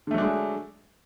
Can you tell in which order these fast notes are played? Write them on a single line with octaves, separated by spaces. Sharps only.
D3 A3 F#3 D4 G#3